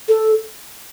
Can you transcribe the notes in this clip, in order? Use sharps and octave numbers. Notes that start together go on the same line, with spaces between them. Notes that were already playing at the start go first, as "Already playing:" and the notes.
A4